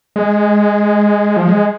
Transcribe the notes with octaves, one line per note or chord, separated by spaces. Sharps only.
G#3
F3
G#3